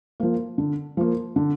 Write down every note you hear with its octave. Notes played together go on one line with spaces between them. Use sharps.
F3 A#3
D3
F3 A#3
D3